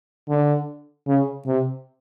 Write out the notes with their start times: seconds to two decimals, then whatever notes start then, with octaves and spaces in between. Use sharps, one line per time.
0.29 D3
1.07 C#3
1.47 C3